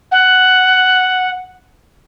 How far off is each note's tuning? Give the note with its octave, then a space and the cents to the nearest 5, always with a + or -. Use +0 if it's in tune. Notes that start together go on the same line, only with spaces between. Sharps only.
F#5 +5